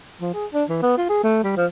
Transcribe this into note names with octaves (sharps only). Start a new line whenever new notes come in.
F3
G#4
D4
E3
B3
F4
G#4
A3
G3
F3